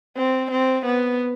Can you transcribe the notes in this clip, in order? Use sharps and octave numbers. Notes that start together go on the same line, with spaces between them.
C4
C4
B3